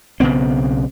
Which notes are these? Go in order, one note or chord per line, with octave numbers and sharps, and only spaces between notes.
B1 C#3 B3 C4